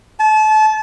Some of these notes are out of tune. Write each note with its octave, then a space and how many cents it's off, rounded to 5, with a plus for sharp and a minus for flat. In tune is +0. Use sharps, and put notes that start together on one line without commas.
A5 -30